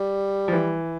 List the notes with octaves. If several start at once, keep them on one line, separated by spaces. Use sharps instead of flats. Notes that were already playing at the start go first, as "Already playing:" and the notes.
Already playing: G3
F3
E3